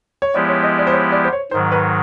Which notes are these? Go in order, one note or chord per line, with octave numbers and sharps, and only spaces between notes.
C#5
F3 G#3 B3 E4 G4 D5
C#5
D#5
D5
C5
C#5
D5
C5
C#5
G#2 D#3 F#3 C5
B4